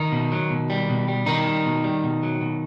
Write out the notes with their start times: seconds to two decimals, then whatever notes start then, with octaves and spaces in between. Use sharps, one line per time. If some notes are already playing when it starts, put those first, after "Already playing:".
Already playing: D#3 D#4
0.12 B2
0.32 F#3
0.50 B2
0.70 G3
0.89 B2
1.08 G3
1.26 B2 D#3 D#4
1.46 G3
1.65 B2
1.84 G3
2.04 B2
2.23 F#3
2.41 B2